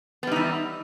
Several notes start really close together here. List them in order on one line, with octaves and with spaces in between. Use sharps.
B3 G3 D#4 E3